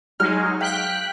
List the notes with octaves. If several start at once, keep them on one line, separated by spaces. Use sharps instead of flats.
F#3 G#3 D#4 F6
F5 G5 F#6 B6